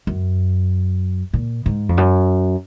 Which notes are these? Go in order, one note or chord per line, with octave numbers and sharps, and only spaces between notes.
F#2
A#2
G#2
F2
F#2